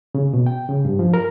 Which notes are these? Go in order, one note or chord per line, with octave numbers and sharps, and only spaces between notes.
C#3
B2
G5
C#3
G2
F3
A#4